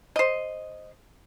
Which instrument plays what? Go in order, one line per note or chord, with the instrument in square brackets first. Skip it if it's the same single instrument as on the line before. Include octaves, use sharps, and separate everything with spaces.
[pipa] C5 D#5